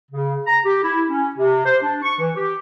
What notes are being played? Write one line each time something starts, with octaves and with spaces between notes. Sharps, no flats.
C#3
A#5
G4
E4
C#4
C3
C5
D4
C#6
E3
G4